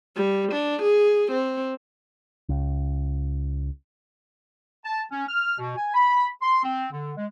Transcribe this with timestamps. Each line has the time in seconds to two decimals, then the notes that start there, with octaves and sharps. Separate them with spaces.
0.16 G3
0.52 D4
0.82 G#4
1.31 C4
2.49 C#2
4.85 A5
5.11 C#4
5.29 F6
5.59 B2
5.77 G#5
5.95 B5
6.42 C6
6.63 C4
6.92 D3
7.17 G#3